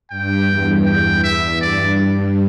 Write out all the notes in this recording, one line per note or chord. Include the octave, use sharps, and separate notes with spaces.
G2 G5
E2
G5
E2 E5
G2 D5